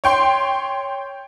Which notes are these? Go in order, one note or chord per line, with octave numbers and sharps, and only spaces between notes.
C#5 G5 C6